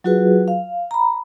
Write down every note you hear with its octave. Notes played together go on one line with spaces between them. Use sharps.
F#3 F4 F#4 G#4 B4
F5
A#5 B5